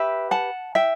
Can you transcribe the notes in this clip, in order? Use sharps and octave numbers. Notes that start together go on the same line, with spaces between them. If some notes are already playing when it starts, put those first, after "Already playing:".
Already playing: G4 B4 E5 G5
F#5 A5
E5 G5